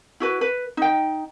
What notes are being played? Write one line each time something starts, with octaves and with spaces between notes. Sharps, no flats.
E4 F#4 B4
B4
D#4 G5